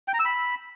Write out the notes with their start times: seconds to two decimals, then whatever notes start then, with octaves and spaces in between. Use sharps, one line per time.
0.08 G5
0.14 A#5
0.19 E6
0.25 B5